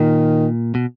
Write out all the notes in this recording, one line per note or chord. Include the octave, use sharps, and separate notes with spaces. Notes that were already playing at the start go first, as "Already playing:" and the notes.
Already playing: A#2 D#3
B2